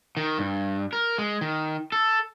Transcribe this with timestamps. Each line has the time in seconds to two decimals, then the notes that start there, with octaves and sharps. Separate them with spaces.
0.17 D#3
0.38 G2
0.93 A#4
1.18 G#3
1.41 D#3
1.92 A4